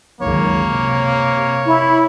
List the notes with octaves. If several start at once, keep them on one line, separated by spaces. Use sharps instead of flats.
C#2 F#2 D#3 A#3 C#5
C3
E4